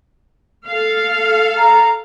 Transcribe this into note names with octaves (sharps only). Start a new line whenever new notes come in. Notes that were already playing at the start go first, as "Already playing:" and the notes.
A4 F5
A#5